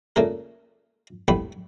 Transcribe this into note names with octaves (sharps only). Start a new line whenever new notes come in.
A#2 C#3 A3 A#4
C2 A2 B3 B5 C#6